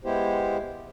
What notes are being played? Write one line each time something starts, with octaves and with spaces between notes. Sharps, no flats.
G#3 B3 E4 G4 C5